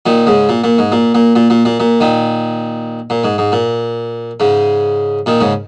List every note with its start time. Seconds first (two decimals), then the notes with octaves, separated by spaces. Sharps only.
0.06 A#2 D#3
0.27 G#2 C#3
0.49 A#2
0.64 A#2
0.78 G#2
0.92 A#2
1.15 A#2
1.35 A#2
1.50 A#2
1.65 A#2
1.80 A#2
2.00 A#2 D#3
3.10 A#2
3.24 G#2
3.38 G#2
3.52 A#2
4.40 G#2 C#3
5.26 A#2 D#3
5.41 G#2 C#3